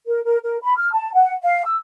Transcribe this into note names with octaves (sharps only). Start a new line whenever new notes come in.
A#4
A#4
A#4
B5
F6
A5
F#5
F5
E6